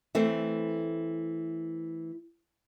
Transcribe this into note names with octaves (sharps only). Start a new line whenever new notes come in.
E3 A3 C4